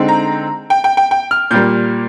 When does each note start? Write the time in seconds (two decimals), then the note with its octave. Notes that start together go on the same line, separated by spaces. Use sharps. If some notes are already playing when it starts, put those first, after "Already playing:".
Already playing: D3 G#3 C4 D#4
0.08 A#5
0.70 G5
0.84 G5
0.97 G5
1.11 G5
1.31 F6
1.51 A#2 G3 A#3 G6